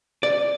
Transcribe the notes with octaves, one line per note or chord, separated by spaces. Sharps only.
D5